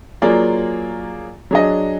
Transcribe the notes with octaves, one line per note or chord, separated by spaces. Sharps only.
F#3 A#3 F4 G#4 D5
F#3 D4 G#4 D#5